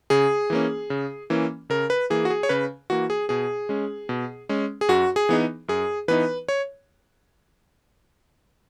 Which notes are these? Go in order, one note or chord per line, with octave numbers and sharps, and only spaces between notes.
C#3 G#4
E3 A#3 C#4
C#3
E3 A#3 C#4
C#3 A#4
B4
E3 A#3 G#4
F#4
G#4
C#5
C#3 B4
E3 A#3 F#4
G#4
B2 G#4
G#3 C#4
B2
G#3 C#4
G#4
F#2 F#4
G#4
E3 B3 D#4
F#2 G#4
E3 B3 D#4 B4
C#5